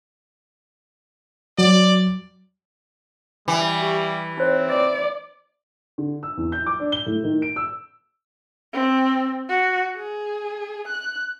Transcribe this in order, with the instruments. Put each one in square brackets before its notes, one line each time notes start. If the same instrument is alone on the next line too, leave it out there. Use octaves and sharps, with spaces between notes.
[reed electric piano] F#3 [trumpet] D5
[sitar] E3 [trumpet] G3 [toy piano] G5
[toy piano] G4
[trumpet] C4 [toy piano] D#4 C5 C#5
[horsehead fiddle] D5 [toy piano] D#5
[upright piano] D3
E6
E2
G6
D6
D4
G7
A2
D#3
D7
E6
[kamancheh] C4
F#4
G#4
F#6